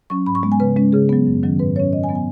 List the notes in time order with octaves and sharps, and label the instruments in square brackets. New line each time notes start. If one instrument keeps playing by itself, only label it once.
[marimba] F#3 C#4 C#6
G#2 B5
C#6
G#3 B3
G#5
C#3 B4
G#3 C#4
C#3 G#4
F#3 B3
F#2
D#3 F#3 C#4
G#2 B4
F#3 C#4 C#5
C#3 D#5
G#5
F#3 B3
G#5